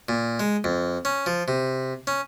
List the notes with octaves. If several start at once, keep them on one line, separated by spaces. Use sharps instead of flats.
A#2
G#3
F2
C#4
F3
C3
C#4